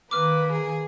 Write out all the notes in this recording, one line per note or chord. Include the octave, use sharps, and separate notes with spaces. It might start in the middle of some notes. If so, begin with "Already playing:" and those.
D#3 A#3 A#4 B4 D6 F6
G#4